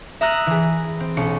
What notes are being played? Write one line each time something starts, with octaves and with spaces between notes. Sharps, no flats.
E5 A#5 D#6 F6 F#6 A#6
E3 G#4
C4
B1 C#4 D6 C#7